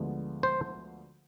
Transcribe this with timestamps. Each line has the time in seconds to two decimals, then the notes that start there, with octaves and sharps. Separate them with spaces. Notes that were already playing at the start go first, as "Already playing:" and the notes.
Already playing: D2 D3 F3 G#3 B3
0.43 C5